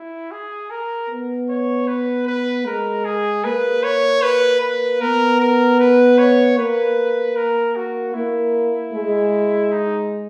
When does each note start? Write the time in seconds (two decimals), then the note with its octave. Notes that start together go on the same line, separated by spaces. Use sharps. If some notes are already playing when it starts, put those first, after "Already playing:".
Already playing: E4
0.31 G#4
0.70 A#4
1.09 B3
1.49 C#5
1.88 B4
2.27 B4
2.66 G#3 A#4
3.05 G#4
3.44 A#3 B4
3.84 C#5
4.23 B4
4.62 B4
5.01 B3 A#4
5.41 A#4
5.80 B4
6.18 C#5
6.58 A#3 B4
7.36 A#4
7.76 F#4
8.14 A#3 E4
8.93 G#3
9.72 D#4